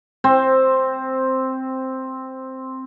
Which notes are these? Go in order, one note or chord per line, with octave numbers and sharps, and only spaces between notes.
C4 C5